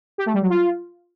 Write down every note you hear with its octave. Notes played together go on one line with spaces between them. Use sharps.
G4
A3
G3
F#3
F4